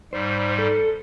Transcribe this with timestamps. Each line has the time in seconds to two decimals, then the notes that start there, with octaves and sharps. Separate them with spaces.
0.13 G#2 G3 C5
0.59 A4